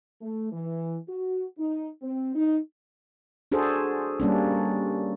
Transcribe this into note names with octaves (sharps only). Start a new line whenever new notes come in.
A3
E3
F#4
D#4
C4
D#4
D4 F#4 G#4 A4 C5
G3 A#3 C#4 D4